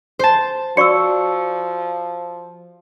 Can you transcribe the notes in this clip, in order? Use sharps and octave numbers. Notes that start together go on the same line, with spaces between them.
C5 A5
F3 F#4 D5 C#6 E6 C#7